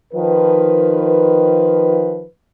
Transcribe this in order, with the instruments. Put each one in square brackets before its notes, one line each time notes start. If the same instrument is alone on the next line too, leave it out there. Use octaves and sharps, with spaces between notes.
[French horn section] D#3 F3 B4